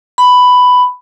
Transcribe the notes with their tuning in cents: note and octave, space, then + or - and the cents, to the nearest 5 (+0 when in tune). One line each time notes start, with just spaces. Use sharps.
B5 +10